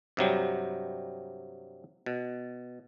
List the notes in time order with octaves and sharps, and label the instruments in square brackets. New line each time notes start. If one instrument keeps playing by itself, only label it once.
[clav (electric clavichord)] G2 C3 F#3 G3
B2